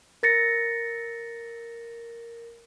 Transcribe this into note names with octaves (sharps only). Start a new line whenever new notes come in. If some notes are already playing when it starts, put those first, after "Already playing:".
A#4 A6 A#6 C#7